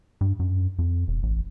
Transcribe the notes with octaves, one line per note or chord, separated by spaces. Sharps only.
G2
F#2
F2
E1
A1